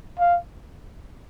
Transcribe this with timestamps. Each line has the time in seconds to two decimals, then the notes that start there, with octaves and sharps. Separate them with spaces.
0.19 F5